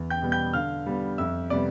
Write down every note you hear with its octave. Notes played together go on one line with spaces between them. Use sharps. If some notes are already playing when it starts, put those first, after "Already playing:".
Already playing: E2
G5 G6
B2 G3 B3
G5 G6
D3 F5 F6
G3 B3
F2 E5 E6
C3 G3 B3 D5 D6